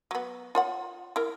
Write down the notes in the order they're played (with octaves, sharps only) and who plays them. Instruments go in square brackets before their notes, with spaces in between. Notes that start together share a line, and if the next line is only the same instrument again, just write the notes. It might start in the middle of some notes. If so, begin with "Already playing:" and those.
[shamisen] F#3 B3
F4 C#5 F#5
E4 A#4